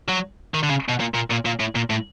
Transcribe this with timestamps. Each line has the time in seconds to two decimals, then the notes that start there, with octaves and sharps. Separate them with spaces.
0.08 F#3
0.54 D#3
0.63 D3
0.69 C#3
0.89 B2
1.00 A#2
1.14 A#2
1.30 A#2
1.45 A#2
1.60 A2
1.75 A#2
1.90 A2